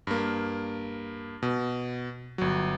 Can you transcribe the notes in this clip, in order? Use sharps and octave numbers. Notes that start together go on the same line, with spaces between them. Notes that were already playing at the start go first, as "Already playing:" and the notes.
G2 A#3
B2
G1 F#3